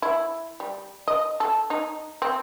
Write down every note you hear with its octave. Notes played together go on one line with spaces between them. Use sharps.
E4
G3
D#5
A4
D#4
C4